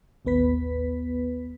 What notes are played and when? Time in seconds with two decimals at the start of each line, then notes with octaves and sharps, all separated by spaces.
0.25 A1 D#2 B3 B4 B6